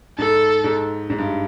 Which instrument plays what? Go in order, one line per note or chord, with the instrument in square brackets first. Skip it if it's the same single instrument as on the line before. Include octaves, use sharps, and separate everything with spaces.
[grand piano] G#2 [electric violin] A4
[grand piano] G#2
G#2
G2